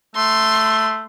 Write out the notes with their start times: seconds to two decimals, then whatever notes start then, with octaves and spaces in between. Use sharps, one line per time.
0.16 A3 C6